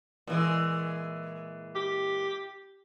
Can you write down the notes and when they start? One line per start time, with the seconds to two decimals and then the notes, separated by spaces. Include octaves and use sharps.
0.27 A#2 E3 G#3
1.75 G4